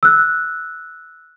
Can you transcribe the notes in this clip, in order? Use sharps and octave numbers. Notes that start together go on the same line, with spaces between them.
E6 F#6